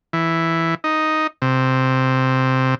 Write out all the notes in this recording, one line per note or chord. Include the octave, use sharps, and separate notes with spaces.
E3
D#4
C3